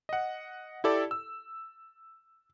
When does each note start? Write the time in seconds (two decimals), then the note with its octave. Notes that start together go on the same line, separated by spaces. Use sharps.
0.09 D#5 F#5
0.84 E4 G4 A4 D5
1.11 E6